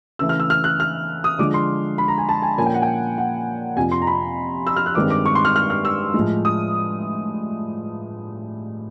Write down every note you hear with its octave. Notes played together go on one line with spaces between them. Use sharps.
C#3 E3 A3 E6
F6
E6
F6
F#6
F6
D#6
D3 F3 G#3 D6
C6
B5
A#5
G#5
A5
G#5
A#2 F3 A#3 C#4 G#5
G5
F#5
G5
F#5
F2 C3 F3 G#5
C6
A#5
B5
E6
F6
F#6
G2 D#3 G#3 C4 D6
D6
C#6
C6
F6
F6
F6
E6
A2 F3 G#3
D#6